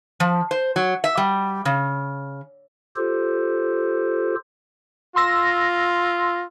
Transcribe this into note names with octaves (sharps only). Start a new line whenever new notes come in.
F3
C5
F#3
E5
G3
C#3
F4 G4 A4 C5
F4 C6 E6 A#6